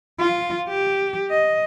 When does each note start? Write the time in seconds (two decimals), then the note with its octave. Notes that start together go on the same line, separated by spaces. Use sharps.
0.20 F4
0.69 G4
1.30 D#5